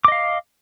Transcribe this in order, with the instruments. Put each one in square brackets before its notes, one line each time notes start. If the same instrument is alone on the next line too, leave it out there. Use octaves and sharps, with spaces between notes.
[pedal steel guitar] D6
D#5
F5